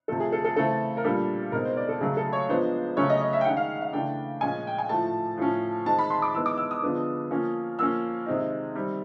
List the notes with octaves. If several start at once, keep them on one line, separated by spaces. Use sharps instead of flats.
C3 F3 A3 A4
G#4
A4
A4
C#3 E3 A3 C4 A4
A#4
A#2 G3 A#3 D4 A4
B2 G#3 C4 D#4 A#4
C5
D5
A4
C#3 F#3 A3 G#4
A4
C#5
F3 G#3 B3 D4 C5
C#3 F#3 A3 C#4 C#5
D#5
D#5
E5
G5
D#3 G#3 C#4 F#5
F5
F5
C#3 E3 A3 D4 G5
A#2 F3 G#3 C#4 G#5
G5
G#5
A2 F3 A3 A5
A2 F3 A3 C#4
D#3 G#3 C4 A5
B5
C6
D6
E3 G#3 B3 D#4 E6
D6
E6
D#6
D3 F3 G#3 B3 D4
F3 A#3 C#4
F3 A#3 C#4 E6
C3 D#3 G#3 C4 D#4
D#3 G3 C4